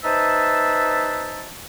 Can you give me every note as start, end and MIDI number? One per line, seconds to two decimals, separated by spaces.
0.03 1.50 63
0.03 1.50 71
0.03 1.50 72
0.03 1.50 76
0.03 1.50 81